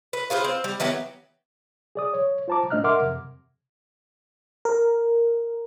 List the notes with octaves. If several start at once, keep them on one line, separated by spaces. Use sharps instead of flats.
B4
F4 G#4 B4 C5
C4
G3
E3 F#3 B3 G4
G#4 D5 D#6
C#5
F4 C5 A5 A#5 D6
A2 A3 D4 D#5 F6 F#6
A#4 E5 F#5 C6 D6 F6
F2 C3
A#4